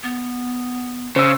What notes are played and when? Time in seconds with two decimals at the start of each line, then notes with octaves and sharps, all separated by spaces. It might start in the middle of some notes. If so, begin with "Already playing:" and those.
0.03 B3
1.16 C#3 C5 E6